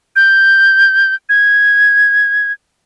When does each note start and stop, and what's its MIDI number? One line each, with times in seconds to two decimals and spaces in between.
0.16 1.15 91
1.29 2.52 92